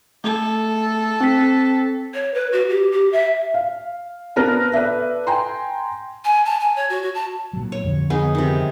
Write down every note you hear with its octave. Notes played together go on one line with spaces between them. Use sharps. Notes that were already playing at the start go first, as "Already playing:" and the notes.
A3 A4
C4 B6
C#5
B4
F#4
G4
G4
E5
F5
B3 D4 A#4 B4 A5
A4 B4 D5 E5
G5 G#5 A#5 C6
G#5
A5
G#5
C#5
F#4
F#4
A5
A#2 F#3
C#5
F2 D3 G3
B3 D#4 G#4
C3 D#3